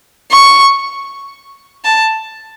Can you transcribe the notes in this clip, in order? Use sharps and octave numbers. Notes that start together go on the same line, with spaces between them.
C#6
A5